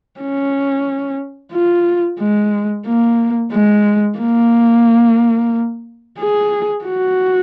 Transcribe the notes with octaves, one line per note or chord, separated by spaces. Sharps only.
C#4
F4
G#3
A#3
G#3
A#3
G#4
F#4